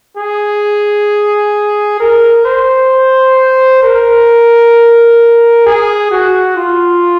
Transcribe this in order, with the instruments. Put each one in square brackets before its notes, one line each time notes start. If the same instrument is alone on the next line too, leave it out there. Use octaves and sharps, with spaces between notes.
[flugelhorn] G#4
A#4
C5
A#4
G#4
F#4
F4